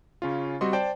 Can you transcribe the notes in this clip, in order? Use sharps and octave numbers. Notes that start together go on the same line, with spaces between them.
C#3 C#4 F4
G3 C4 F#4 D#5 C6
C5 D5 G5 A5